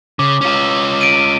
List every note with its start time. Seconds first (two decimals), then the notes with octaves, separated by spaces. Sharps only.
0.19 C#3 D6
0.41 C#4 F4
1.01 D7 D#7
1.18 D#7